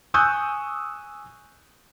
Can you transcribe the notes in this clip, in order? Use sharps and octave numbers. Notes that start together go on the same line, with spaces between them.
G#5 C#6 D#6 E6 F#6 G6